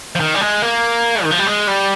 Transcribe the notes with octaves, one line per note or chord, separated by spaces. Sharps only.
F3
D#3
G3
G#3
A#3
D#3
F3
G3
G#3
G3